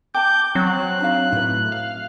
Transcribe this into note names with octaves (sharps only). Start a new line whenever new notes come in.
G5 A5 D6 G6
F#3 C4 F#6
D4 D#4 F5
A2 E4 B4
F5